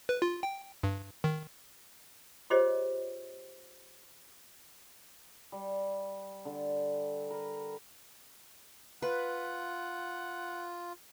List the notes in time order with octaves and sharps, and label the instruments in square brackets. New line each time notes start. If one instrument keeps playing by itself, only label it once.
[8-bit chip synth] B4
F4
G5
G2
D#3
[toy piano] F4 G4 G#4 C5 C#5 D#5
[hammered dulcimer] G3
D3
A#4 B4
[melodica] F4 [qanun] B4 [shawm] F#5